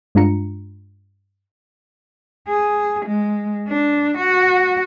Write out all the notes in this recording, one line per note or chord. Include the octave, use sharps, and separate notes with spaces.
G2 G#3 D4 F4 A#5 C#7
G#4
G#3
D4
F#4